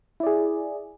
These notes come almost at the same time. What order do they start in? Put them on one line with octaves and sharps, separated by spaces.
E4 D5 G#4